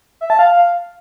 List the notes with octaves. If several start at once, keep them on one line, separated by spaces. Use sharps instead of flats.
E5
A5
F5